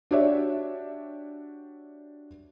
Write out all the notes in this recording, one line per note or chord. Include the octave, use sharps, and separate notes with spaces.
D4 F#4 G4 C#5 D5 E5